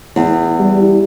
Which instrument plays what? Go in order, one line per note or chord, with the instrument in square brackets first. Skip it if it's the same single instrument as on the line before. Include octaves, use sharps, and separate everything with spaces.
[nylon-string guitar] E2
[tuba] G3